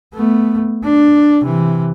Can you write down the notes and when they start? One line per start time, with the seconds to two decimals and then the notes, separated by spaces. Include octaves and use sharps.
0.14 A3 B3
0.84 D4
1.41 C3 E3